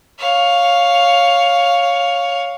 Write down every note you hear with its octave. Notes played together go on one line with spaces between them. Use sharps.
C#5 F5